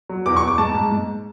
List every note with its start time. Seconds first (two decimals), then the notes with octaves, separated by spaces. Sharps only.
0.09 F#3
0.26 E2 D6
0.36 C#6
0.42 E2
0.48 D6
0.58 G#2 A5
0.75 G#2
0.92 G#2